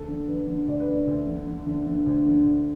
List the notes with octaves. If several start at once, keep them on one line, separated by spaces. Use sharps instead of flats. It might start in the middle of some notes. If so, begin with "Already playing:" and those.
Already playing: D2 A4
D3
D3 B4
D3
D2 D5
B4
D3 D5
D2
D3
D3
D3
D3
D2
D3
D2